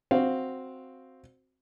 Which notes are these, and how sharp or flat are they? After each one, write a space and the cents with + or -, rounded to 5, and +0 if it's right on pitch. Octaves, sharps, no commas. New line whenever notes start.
C4 +0 F#4 +0 F5 +0